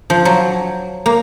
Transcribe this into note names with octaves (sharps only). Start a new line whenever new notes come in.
F3
F#3
A#3